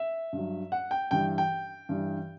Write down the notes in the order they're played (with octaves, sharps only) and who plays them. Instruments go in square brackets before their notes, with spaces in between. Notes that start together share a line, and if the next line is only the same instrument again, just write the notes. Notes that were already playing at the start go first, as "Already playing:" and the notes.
Already playing: [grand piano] E5
G2
F#3
F#5
G5
G2 E3 G3 G5
G5
G2 E3 G3